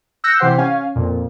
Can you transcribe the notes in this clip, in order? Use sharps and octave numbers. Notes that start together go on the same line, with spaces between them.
E6 F#6 G6 A#6 C#7
C3 E3 G4 C5 F#5 C7
C#4 F5 G#5
F2 A#2